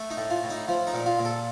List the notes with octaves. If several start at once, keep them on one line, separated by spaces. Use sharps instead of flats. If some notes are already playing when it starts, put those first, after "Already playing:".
Already playing: A3
D#4
A2
F4
A2
D#4
F3
D#4
A#2
F4
A#2
A4